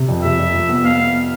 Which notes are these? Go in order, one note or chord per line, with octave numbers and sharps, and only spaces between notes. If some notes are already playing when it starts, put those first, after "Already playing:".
Already playing: C3
F2
C3 E5
F2
F3
B3
B3 F5
B3